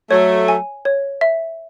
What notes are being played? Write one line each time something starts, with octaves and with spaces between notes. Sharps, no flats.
F#3 A3 C#5
G#5
C#5
E5